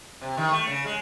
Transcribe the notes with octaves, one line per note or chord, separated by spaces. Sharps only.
C3
D#3
A3
C#3
G#3